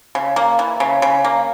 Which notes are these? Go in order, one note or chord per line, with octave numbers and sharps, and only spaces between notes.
C#3
A#3
E3
C#3
C#3
A#3